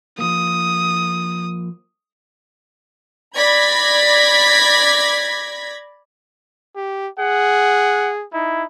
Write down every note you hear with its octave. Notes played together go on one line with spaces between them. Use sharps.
F3 A#3 D#6
D5 B5 G#6 A#6 B6
G4
G#4 F#5
D#4 E4